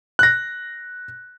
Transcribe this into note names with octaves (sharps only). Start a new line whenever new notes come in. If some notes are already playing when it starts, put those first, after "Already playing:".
F#6 A#6